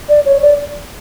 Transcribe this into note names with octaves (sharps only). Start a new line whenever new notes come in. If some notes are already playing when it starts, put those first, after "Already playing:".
D5
C#5
D5